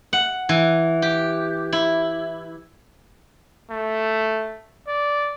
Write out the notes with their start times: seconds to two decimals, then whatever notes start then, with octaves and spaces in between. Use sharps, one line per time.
0.13 F#5
0.49 E3
1.02 G4
1.72 E4
3.70 A3
4.88 D5